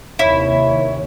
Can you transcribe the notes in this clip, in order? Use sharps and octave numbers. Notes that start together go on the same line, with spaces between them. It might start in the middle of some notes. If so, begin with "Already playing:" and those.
D#2 C3 E4 C#5